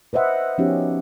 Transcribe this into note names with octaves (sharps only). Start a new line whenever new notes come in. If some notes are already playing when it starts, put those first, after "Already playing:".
B4 C5 D#5 E5 F#5
F3 B3 C#4 D#4 F#4 G4